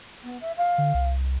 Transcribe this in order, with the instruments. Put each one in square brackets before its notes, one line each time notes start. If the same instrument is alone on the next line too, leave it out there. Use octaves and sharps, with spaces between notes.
[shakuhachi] B3
E5
F5
[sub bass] D3
C2